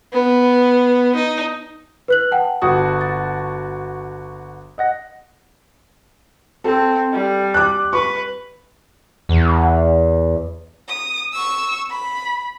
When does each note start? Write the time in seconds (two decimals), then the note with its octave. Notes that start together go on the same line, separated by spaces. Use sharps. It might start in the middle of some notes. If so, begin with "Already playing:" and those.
0.13 B3
1.15 D#4
2.08 B4 F#6 F#7
2.31 F#5 G5 A5
2.62 G1 F#4 A5 D#6
3.01 A6
4.78 D#5 F#5 A#6
6.64 C4 A4
7.13 G3
7.54 D6 F#6
7.93 B4 C#6
9.29 E2
10.88 D#6
11.33 C#6 E6
11.90 B5